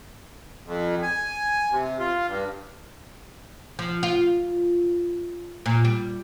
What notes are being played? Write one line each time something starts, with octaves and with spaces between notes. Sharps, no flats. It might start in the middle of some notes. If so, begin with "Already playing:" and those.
F2
G#5
C3
F4
G2
F3
F4
A#2
G3